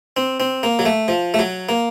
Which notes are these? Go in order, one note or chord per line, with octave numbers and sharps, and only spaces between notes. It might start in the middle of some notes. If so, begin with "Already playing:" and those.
C4
C4
A#3
F#3
A3
F3
A3
F#3
A#3